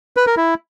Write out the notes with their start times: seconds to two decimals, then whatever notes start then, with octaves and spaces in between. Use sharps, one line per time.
0.17 B4
0.27 A#4
0.37 E4